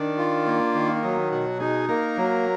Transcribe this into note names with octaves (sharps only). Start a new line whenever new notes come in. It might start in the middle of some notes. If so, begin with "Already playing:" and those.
Already playing: D#3 D4
F4
A#3
D#3
F#3 D#4
B2 F#4
D#4 G#4
A#3 A#4
F#3